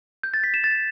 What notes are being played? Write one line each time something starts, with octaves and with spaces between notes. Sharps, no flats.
G6
A6
B6
E7
A6